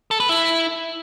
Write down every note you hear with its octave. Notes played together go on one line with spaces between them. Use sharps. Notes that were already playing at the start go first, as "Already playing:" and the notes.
A4
B4
E4